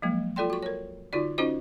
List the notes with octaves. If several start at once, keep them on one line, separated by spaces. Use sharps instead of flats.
F3 F#3 G#3 A#3
F4 A4 D5 G5 C6
F#4 C#6
A#4 C#5
D3 D#4 F4 F#4 D5
C#4 D#4 F4 F#4 C5 D#5